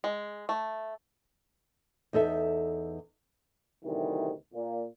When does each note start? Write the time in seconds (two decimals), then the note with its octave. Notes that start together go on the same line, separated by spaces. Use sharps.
0.04 G#3
0.49 A3
2.13 E2 D#4 A4 E5
3.84 D2 C3 D#3 E3 G3
4.54 A#2